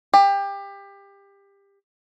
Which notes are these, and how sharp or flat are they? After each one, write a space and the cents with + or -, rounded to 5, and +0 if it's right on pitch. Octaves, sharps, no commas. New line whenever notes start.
G4 +25